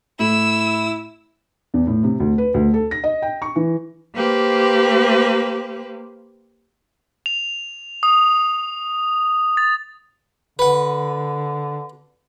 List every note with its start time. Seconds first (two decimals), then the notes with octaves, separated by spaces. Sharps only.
0.20 A2 E4 E6
1.74 E2
1.87 A2
2.03 C3
2.20 D2
2.38 B4
2.54 D2
2.74 A4
2.91 A#6
3.04 D#5
3.22 G5
3.42 C#6
3.56 E3
4.14 A#3 G4 B4 C5
7.26 F7
8.03 D#6
9.57 A6
10.59 D3 B4 F#5